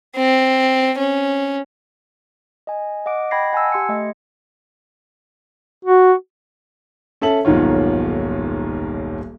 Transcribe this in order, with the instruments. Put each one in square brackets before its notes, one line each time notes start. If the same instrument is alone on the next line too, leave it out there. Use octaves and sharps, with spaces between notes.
[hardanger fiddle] C4
C#4
[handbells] D#5 G#5
D#5 F#5 D6 D7
D#5 G5 B5 G#6 A#6 C7
F#5 G#5 A5 E6
G4 C6 G#6 C#7
A3 D#5
[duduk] F#4
[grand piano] C#4 A4 E5 A5 F#7
D#1 B1 G#2 D#3 F4 C#5